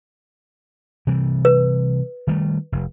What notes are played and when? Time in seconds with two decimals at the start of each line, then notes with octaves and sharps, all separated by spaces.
1.07 C3 E3 G3
1.45 B4
2.27 D#3 G3 A3
2.72 F1